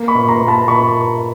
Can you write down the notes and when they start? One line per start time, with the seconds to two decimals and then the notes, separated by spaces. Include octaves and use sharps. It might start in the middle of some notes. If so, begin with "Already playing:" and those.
Already playing: A#3
0.08 B5 C#6
0.15 A#2
0.28 A#5 C6
0.41 A#3
0.48 A5 B5
0.68 A#2 B5 C#6